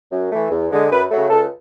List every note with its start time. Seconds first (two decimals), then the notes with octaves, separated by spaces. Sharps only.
0.12 F#2
0.31 E3 A3
0.51 E2
0.72 D3 G#3
0.91 F#2 B4
1.11 C#3 F#3 A3
1.30 C#2 A4